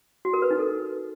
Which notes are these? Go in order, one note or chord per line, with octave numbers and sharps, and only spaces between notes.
F#4
A#4
B4
D#4
A4